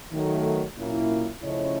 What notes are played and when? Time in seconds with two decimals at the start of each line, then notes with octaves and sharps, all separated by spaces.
0.13 D#3 F#3 A3
0.78 A#2 F#3 A#3 C#4 E4
1.43 C#3 F3 A3 C#4 E4 C#5 D#5